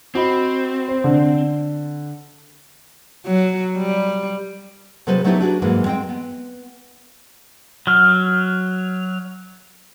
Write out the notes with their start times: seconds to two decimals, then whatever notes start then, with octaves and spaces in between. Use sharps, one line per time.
0.15 C4 F#4 D#5 B5
0.88 C5
1.04 D3
3.26 F#3
3.77 G3
5.07 C3 F#3 G#4 A4 B4 C5
5.24 F#3 A3 B3 D#4 E4 G4
5.41 D4 F#4 G#4 B4
5.62 G#2 E3 F#3 G#3 A#3
5.85 G#3 C4 D#5 G5
6.09 B3
7.87 F#3 F6